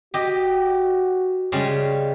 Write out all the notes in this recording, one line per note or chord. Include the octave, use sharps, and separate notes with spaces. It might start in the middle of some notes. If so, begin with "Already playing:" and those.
F#4 G4 D#5
C#3 G3 G#3